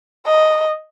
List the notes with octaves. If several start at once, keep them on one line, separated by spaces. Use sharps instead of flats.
D#5